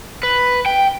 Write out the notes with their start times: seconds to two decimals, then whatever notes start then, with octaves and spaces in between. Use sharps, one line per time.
0.23 B4
0.66 G5